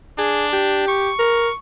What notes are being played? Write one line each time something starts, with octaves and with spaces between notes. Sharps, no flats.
D4 G#4
G4
C#6
A#4